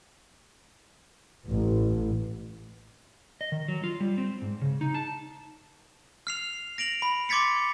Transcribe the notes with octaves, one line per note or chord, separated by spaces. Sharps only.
A1
D#5
D#3
F#3
F4
G3
C4
G#2
C#3
D#4
A5
F6 C7 F7
A#6 D7 F7 F#7
B5
C6 D6 G#6 A6 B6 C#7